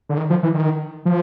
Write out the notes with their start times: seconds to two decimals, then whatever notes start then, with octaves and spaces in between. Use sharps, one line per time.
0.09 D3
0.17 D#3
0.30 F3
0.43 E3
0.54 D#3
1.05 F3